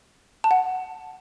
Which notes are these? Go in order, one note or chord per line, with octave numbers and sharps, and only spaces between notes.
A5
F#5